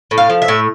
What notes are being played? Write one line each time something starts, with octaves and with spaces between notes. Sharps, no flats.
A2
F5
F3
E5
A2